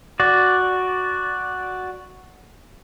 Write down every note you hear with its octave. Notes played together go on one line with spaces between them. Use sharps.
F#4 D5